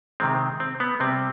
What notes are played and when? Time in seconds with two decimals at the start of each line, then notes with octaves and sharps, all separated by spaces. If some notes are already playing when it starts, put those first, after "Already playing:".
0.20 C3 D#3 G#3 C4
0.60 C4
0.80 B3
1.00 C3 G3 C4